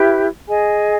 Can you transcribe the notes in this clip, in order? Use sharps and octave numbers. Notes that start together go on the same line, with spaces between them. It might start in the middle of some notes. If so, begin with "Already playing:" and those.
Already playing: E4 G4 B4 E5
G#4 D#5 G#5